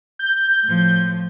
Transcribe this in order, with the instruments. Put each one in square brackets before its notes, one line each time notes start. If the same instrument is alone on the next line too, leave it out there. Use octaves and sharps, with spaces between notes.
[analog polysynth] G6
[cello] A2 F3